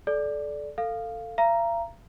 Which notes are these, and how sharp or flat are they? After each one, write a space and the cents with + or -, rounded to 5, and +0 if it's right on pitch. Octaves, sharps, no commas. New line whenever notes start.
A4 -30 D5 +0
A4 +25 F5 +0
F5 -45 A#5 +0